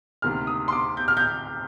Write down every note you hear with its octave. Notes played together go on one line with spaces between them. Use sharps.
D2 C3 D#3 A#3 F6
D#6
C6
D6
G6
F6
G6